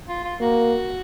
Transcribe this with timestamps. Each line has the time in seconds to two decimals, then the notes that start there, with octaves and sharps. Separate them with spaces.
0.08 F4
0.24 F4
0.40 A#3 F#4